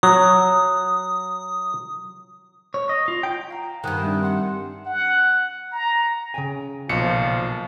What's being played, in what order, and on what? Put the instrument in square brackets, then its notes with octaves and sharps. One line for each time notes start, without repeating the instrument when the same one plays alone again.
[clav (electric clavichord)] F#3 [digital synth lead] D#6
[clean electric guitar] C#5
D#5
F4
G5
[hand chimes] F5 A#5
[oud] G2 D#3 [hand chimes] F#5 G#5 D#6 [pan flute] F#6
[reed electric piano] G3 C4 D4 [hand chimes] E5
[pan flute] F#5 [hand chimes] C6 C#7
[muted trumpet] F#5
A#5
[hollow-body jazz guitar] C#3 G5 G#5
[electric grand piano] B1 C#7 [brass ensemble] A#2 F3